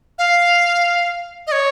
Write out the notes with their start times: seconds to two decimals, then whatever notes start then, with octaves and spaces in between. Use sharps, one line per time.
0.18 F5
1.47 D#5
1.52 C#5